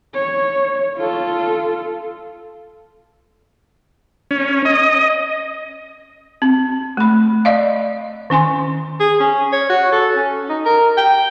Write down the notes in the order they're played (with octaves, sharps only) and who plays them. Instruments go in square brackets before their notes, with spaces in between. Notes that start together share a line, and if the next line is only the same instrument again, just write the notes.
[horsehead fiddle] C#5
F4 A4
[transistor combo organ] C#4
D#5
[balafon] C4
A3 B5
D5 D#5 F5
D#3 C#4 G#5 C6
[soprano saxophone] G#4
C#4
C#5
F#4
A4
C#4
D#4
A#4
G5